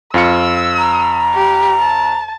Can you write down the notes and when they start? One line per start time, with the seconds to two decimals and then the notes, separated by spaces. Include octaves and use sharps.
0.14 F2 F4 E6 C#7
0.78 A#5
1.34 G4
1.80 A5